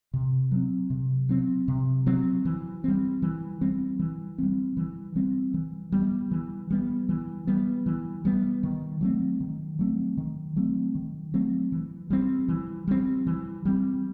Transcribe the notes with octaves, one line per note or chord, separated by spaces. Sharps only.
C3
F#3 C4
C3
F#3 C4
C3
F#3 C4
E3
G3 C4
E3
G3 C4
E3
G3 C4
E3
G3 C4
E3
G3 B3
E3
G3 B3
E3
G3 B3
E3
G3 B3
D#3
F#3 A3 C4
D#3
F#3 A3 C4
D#3
F#3 A3 C4
D#3
F#3 A3 C4
E3
G3 C4
E3
G3 C4
E3
G3 C4